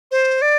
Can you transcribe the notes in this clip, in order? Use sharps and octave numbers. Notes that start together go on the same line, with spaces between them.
C5
D5